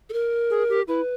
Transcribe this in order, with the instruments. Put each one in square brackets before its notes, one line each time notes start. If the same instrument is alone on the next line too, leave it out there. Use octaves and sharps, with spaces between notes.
[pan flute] A4
A#4
[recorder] G#4
G4
[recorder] E4 [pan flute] B4